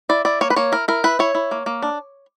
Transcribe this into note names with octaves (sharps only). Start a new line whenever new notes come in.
E4 D5
E4 D5
A#3 C#5
B4
A#3 C#5
E4 A#4
E4 A#4
E4 B4
E4 C#5
E4
A#3
A#3
D4